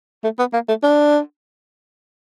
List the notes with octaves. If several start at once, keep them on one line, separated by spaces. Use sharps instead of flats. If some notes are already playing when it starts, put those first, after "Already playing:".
A3
B3
A#3
A3
D4